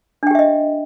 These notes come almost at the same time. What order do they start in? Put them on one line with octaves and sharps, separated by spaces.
D4 G5 G4 E5 D#5